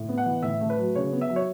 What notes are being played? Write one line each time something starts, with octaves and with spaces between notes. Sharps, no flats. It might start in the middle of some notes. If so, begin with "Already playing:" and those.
Already playing: A2
B3
F#5
E3
A2 E5
A3
B4
F#3
C#3 C#5
B3
E5
F#3
C#5